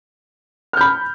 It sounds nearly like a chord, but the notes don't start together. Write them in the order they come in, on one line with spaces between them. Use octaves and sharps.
F6 G6 B5